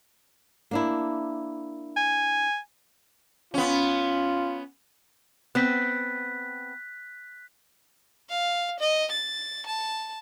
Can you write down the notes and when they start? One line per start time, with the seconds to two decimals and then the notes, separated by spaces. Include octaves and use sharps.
0.71 A#3 D4 E4
1.96 G#5
3.54 B3 C#4 F4
5.55 B3 C4 F#6 B6
8.29 F5
8.80 D#5
9.12 A6
9.67 A5